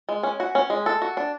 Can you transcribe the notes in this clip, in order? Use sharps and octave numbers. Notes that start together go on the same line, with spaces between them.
G#3
C#4
F#4
C#4
G#3
A4
F#4
D4